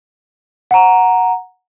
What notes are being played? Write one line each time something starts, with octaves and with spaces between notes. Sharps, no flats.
F#5 A#5